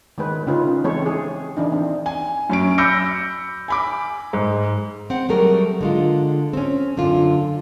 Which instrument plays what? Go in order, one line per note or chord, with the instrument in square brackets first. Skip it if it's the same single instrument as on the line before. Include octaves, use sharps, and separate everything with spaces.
[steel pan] D#3 G#3 B4
C#3 C#4 D#4 F4 B4
E3 G#3 C4 A4 C#5
C4 G#4
E3 D4 D#4
C4
[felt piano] G#5
F#2 C#4 D7
B5 D6 E6 G6 A#6 C#7
G#5 B5 D6
G#2
[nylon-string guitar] C4 F#5
F#3 G3 A3 G#4 A#4
D3 G#3 F4
C4 C#4
F#2 D3 D4 F4